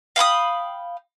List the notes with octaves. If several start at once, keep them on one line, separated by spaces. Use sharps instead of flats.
F5 G5 B5 D#6